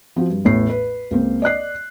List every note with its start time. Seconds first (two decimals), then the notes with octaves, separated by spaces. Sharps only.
0.16 F3 C4 F#4
0.30 G2
0.44 A1 E2 A2 C7
0.70 B4
1.11 C#2 A#3 C4
1.42 D5 D#5 F#6 C7